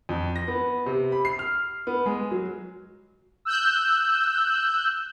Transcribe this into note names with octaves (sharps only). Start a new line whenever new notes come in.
F2
A#6
B3
C3
B5
C7
F6
B3
G#3
F#3
E6 F#6 G6